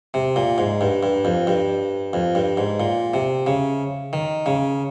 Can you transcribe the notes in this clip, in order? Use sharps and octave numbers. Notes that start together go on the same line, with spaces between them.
C3
A#2
G#2
G2
G2
F2
G2
F2
G2
G#2
A#2
C3
C#3
D#3
C#3